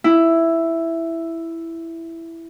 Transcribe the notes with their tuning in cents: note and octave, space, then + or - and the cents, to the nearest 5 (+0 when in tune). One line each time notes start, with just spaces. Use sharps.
E4 +5